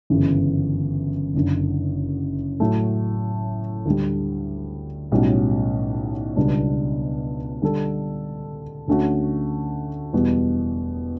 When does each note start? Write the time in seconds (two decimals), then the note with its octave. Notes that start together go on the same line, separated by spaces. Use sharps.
0.10 G1 F#2 C#3 E3
1.34 F#1 F#2 D3
2.60 A2 F#3 A3
3.86 D2 D3 G3
5.12 B1 A2 G3 C#4 F#4
6.36 C#2 B2 G3 B3 D4
7.62 D3 G3 D4 A4
8.88 D2 D3 A3 C#4 F#4
10.13 E1 E2 B2 G3